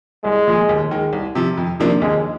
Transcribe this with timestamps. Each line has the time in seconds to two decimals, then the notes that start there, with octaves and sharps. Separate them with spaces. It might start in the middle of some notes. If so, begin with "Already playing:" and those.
0.24 C2 G#3
0.47 A#2 F3
0.69 D#2
0.91 D#3 G#3
1.13 C2
1.35 C3 F3
1.57 F2
1.80 C3 F3 A#3 D4
2.02 D#2 G#3